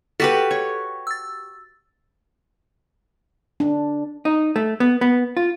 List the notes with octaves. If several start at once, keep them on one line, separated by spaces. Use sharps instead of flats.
F#4 G4 A4 B4 A6 B6
C#5
E6 A6
D4
D#4
A3
B3
B3
F4